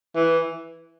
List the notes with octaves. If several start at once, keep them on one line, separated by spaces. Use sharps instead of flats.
E3